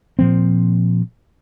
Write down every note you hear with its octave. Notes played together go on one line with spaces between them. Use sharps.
A#2 F3 C4